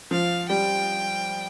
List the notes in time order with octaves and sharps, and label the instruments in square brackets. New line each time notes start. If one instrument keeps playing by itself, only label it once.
[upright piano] F3 [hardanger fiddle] F5
[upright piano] G3 [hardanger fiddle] G5